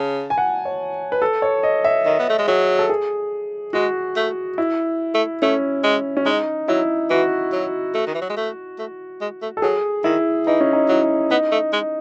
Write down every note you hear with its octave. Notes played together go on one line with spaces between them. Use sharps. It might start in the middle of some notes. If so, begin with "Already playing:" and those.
Already playing: C#3 A5
G#5
F#5
C#5
B4
A4
C#5
D#5
E5
D#3 D#5
B3
A3
G#3
F#3 G#4
A4
G#4
G#3 F#4
A3
E4
A3
A3 C#4
G#3
C#4
G#3 D#4
F#3 E4
E3 F#4
F#3
A3
D#3
E3
F#3
G#3
A3
A3
G#3
A3
A4
F#3 G#4
D#3 E4
E3 D#4
C#4
D#4
F#3 E4
B3 D#4
A3
G#3